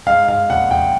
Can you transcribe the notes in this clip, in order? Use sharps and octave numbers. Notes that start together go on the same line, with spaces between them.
G#2 F5
G#2 F5
A#1 F#5
A#1 G5